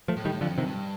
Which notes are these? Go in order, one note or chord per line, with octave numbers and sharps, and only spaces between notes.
F3 A3
A2
D#3 G3
F2 D3 F3
C3 D#3
G2